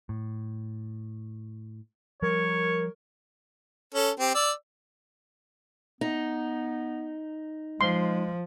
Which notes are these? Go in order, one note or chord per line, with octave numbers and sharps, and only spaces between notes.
A2
F3 G3 A#4 C#5
C#4 A4
C4 G4
D5 E6
B3 D#4
F3 G#3 C6